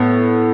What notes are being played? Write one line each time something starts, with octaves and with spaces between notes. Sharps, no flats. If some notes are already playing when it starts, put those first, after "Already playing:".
Already playing: A2 B3